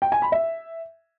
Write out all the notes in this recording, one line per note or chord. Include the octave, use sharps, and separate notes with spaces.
G5
G#5
B5
E5